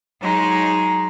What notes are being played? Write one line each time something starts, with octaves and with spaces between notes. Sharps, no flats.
F#3 G#3 D#4